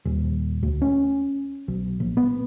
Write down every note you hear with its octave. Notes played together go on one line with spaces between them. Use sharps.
D#1
D2
C#4
B1
A#1
B3